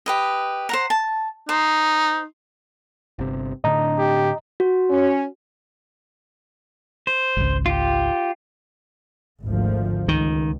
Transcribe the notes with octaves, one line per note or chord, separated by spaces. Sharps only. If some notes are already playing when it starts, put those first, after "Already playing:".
G4 B4 D#5
C5 F#5 A#5
A5
D#4 C5
G1 C3
A2 D3 D4 D#5 A#5
G4
F#4
C#4
C5
G#1 C#2
F4 G4
G#1 D2 F3
C#2 D#3